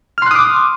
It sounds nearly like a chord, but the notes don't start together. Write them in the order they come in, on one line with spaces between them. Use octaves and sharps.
F6 C6 F#6 D#6 D6